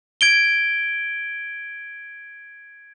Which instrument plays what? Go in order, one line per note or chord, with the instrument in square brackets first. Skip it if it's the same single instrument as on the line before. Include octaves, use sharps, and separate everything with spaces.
[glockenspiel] G#6 D7 G7